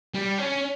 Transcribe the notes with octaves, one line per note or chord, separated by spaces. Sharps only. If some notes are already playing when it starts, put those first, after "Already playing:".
G3
C#4